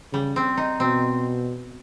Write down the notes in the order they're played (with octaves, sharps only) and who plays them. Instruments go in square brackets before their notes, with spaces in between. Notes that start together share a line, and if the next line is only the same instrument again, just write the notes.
[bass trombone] C#3 [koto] G3
[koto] C4
D#4
[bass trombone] B2 [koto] C4